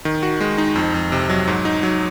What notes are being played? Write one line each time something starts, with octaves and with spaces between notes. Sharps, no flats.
D#3
F#4
G#3
D#4
F2
F2
C3
F#3
G#2
D#4
F#3